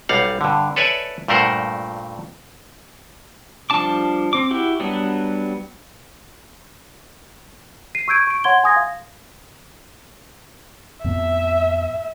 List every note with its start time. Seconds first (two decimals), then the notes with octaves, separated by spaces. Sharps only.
0.09 B1 G3 F5 F#5
0.41 G2 D3
0.76 A4 B4 C#5 D5 E5 G#5
1.28 G2 A#2 A3 A#4 C5 F#5
3.70 F3 G3 D4 A5 D6
4.33 C4 D6
4.51 E4 F#4 G4
4.80 F#3 G3 B3 D4
7.95 C7 D#7
8.08 C#6 E6 G6 G#6 D7 D#7
8.27 C#6 D7
8.44 C#5 F#5 C6 G#6 G7
8.64 G#5 C6 D#6 G#6 A#6
8.76 F5
11.04 F2 A2 B3 E5